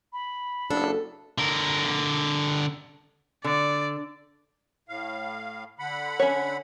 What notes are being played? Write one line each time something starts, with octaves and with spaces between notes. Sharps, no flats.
B5
F#1 D4 A4
D3 A#4
D3 D5
A2 F5
D3 F#5 B5
C#4 C#5